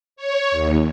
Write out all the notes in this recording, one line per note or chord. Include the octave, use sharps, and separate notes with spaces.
C#5
D#2